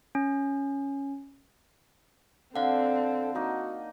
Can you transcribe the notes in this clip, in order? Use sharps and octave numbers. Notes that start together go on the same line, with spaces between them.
C#4
D3 C4 A4 F5 F#5
A#3 D#4 F#4 A5